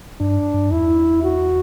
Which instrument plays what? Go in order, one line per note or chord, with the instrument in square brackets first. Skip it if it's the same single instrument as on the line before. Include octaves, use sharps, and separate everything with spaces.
[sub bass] G2 [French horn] D4
[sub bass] G2
[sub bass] E2 [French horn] E4
[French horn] F#4